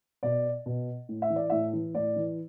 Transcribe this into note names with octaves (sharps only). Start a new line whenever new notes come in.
B2 D5
B2
A2
E5
E3
D5
A2 E5
E3
A2 D5
E3